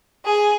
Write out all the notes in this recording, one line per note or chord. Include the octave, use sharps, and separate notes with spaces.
G#4